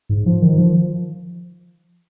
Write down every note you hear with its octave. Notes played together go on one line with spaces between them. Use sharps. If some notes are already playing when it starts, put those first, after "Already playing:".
G#2
F3
D#3
F3